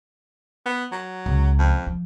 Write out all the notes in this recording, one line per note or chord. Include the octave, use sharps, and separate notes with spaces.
B3
F#3
C#2
F2
F3